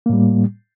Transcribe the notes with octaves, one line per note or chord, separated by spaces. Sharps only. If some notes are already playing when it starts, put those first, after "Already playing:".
A2 G3 A#3